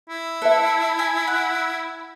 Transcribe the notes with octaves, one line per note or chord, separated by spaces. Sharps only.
E4
A4 B4 E5
G#5
F#5